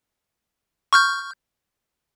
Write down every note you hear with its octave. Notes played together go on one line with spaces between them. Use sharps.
C#6 F6 G6